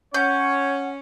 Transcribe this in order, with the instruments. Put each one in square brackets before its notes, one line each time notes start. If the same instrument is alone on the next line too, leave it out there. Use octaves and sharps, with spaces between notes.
[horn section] C#4 [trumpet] C#5 [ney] F#5 [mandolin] G6